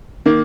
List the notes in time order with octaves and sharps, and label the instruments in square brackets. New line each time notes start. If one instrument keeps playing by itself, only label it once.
[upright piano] D#3 A#3